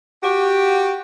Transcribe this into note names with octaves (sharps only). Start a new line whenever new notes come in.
F#4 G4